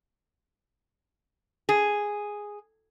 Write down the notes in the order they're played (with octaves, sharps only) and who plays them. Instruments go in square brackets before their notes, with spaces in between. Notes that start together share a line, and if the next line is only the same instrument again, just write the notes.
[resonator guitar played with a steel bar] G#4